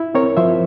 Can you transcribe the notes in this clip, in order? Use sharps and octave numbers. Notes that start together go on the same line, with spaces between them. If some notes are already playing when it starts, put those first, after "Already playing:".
Already playing: E4
C4 A#4 C#5
F3 C5 E5